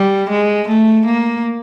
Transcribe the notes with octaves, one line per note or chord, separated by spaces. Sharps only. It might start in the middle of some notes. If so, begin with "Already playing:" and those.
Already playing: G3
G#3
A3
A#3